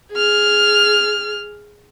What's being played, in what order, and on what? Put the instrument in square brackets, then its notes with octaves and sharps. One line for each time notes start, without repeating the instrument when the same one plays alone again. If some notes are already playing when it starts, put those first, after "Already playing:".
[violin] G#4 F6